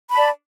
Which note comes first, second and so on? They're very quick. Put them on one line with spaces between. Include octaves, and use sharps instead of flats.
B5 A5 D5